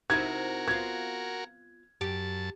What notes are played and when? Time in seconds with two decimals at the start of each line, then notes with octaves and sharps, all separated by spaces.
0.10 C3 D#4 E4 F#4 A#4 G#6
0.68 B3 F4 G#6
2.01 F#2 G4 A5